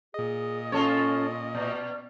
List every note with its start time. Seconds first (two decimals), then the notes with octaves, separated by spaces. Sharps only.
0.14 A#2 G#4 D#5
0.72 C#4 F4 A4 C#5
1.55 B2 D5